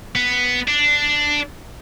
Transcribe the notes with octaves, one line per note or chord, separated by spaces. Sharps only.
B3
D4